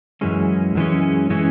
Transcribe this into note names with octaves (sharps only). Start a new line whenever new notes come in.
F#2 E3 G#3 C#4
F#2 E3 G#3 C#4
E3 G#3 C#4